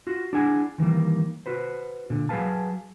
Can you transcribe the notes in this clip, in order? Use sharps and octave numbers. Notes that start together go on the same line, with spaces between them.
F4 F#4
D4 E4 G#4 F#5 G#5
D#3 E3 G3 A#3
F#4 B4 C5
A#2 D3
F#3 G#4 A#4 B4 F5 A5